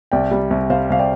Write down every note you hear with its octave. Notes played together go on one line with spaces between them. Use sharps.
C2 D5 G5
G3
C2
C3 C5 F5
C2 F5
D5 G5